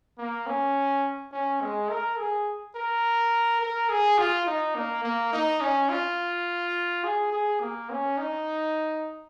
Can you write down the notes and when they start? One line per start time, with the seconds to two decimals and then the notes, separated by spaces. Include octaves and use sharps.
0.18 A#3
0.47 C#4
1.32 C#4
1.61 G#3
1.90 A#4
2.18 G#4
2.76 A#4
3.61 A#4
3.90 G#4
4.18 F4
4.47 D#4
4.75 A#3
5.04 A#3
5.33 D#4
5.61 C#4
5.89 F4
7.04 G#4
7.32 G#4
7.61 A#3
7.90 C#4
8.18 D#4